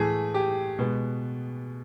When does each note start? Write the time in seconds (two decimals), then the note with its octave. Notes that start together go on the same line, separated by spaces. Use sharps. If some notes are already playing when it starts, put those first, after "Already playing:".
Already playing: A2 E3 A3 G#4
0.34 G4
0.79 B2 G#3 B3